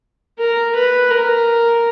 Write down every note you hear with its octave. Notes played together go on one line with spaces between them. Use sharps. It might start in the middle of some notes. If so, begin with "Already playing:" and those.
A#4
B4
A#4